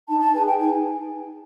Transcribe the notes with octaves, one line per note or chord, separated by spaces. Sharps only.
D#4 A5
A5
G#4 B4 G#5
G5
D#4 G#5